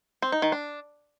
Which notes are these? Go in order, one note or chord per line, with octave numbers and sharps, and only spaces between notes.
C4
D#4
D#3
D4